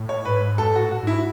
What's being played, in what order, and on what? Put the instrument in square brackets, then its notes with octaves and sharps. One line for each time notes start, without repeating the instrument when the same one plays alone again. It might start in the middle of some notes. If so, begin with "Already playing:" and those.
Already playing: [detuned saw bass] A2
[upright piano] C#5
[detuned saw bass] G#2 [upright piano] B4
[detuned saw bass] F#2 [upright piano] A4
[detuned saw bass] G#2
[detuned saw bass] A2 [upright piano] F#4
[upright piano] F#4
[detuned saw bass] G#2 [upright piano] E4